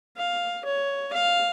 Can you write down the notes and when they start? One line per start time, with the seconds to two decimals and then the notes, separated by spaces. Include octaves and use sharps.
0.17 F5
0.65 C#5
1.13 F5